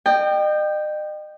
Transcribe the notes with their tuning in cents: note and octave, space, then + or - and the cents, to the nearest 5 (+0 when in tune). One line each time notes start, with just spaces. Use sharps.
D#5 -40 G5 +0